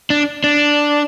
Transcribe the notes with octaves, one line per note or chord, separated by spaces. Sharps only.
D4
D4